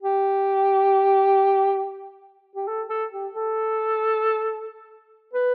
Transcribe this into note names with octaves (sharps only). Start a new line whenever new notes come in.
G4
G4
A4
A4
G4
A4
B4